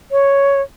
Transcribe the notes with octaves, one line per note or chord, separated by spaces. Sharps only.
C#5